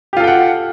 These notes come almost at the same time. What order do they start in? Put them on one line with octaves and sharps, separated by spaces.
G4 F4 A4 G5 F#5